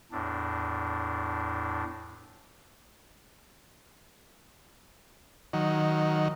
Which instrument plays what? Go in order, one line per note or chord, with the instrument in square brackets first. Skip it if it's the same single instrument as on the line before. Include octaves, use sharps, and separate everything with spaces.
[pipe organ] E2 A2 D4
[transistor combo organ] D#3 F#3